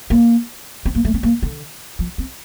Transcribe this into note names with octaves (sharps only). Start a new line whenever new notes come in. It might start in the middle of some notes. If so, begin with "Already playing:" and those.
A#3
C4
A#3
A3
C4
A#3
D3
F3
C4